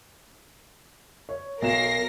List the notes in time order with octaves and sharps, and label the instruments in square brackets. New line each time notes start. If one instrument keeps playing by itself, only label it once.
[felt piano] C#5
[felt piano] B1 F#3 E7 [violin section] A#4 A#6 C7